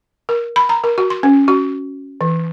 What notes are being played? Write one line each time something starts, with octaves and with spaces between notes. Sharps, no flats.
A#4
B5
A#5
A#4
F#4
C6
C#4
F#4
E3